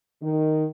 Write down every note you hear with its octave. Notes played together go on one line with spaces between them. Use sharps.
D#3